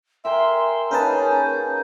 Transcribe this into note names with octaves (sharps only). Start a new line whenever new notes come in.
A#4 E5 G5 G#5 C6
A#3 C#4 D#4 G#4 A#4 B4 A5 G6